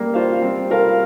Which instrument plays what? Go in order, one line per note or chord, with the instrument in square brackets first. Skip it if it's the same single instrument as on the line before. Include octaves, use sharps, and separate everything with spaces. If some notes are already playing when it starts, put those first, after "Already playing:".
Already playing: [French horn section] G3 [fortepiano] A#3
[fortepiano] F4 C5 F5
[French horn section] G3 [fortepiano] C4
[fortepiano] F4 A#4 F5